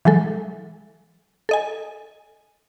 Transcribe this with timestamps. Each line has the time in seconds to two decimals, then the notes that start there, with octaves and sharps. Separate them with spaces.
0.05 E3 F#3 G#3 A4
1.49 A4 D#5 G#5